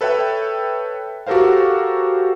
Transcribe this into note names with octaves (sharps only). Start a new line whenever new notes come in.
A4 B4 C#5 E5 G5
F#4 G4 A4 A#4 C5 F5